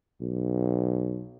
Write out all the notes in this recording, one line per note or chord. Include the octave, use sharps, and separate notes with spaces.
B1